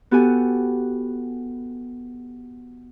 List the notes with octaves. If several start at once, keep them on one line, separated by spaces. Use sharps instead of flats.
B3 F#4 G4 A4 G#5